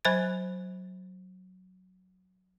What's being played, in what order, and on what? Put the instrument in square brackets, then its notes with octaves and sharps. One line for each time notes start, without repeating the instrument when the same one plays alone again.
[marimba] F#3 C5 G#5 B5 G#6 A6